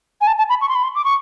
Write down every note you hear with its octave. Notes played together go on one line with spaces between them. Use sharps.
G#5
A5
A5
B5
C#6
C6
B5
C6
D6
C#6